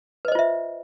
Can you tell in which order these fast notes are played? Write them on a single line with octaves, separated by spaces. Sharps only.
B4 D#5 C5 F4 E5